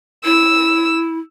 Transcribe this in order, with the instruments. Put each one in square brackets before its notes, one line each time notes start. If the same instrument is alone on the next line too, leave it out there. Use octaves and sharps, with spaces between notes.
[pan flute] E4 [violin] E6